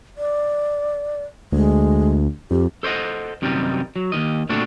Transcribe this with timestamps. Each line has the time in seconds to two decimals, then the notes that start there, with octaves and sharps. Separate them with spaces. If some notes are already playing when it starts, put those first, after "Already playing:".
0.18 D5
1.52 D2 G#3
2.51 F2 G4
2.83 A4 C5 C#5 D#5 F#5
3.42 F#2 C3 D#3 G3 D4 D#4
3.96 F#3
4.12 D#2 B2 D#3 D#5
4.49 A#2 D3 A3 C4 D4 F#4